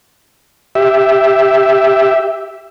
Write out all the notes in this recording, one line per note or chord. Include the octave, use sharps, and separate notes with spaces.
G4 E5